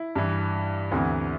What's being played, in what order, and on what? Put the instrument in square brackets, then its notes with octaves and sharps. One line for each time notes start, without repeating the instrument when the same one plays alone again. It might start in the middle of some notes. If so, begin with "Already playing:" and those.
Already playing: [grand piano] E4
G2 E3
D2 C3 E3 B3